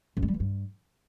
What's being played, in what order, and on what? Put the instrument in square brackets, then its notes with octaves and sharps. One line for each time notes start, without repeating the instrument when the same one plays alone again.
[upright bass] F#2
G#3
G3
E3
G2